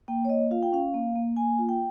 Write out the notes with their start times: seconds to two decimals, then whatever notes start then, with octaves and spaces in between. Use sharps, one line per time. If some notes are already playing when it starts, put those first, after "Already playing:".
0.08 A#3 G5
0.25 C#5
0.29 A#3 D#5
0.51 F4 F5
0.63 G5
0.72 C#4 F5
0.94 A#3
1.15 A#3
1.37 A#3 G#5
1.58 F4
1.69 G5